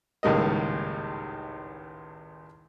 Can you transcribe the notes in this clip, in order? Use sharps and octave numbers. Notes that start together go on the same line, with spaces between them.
G#1 C#2 A2 G3 A#3 D#5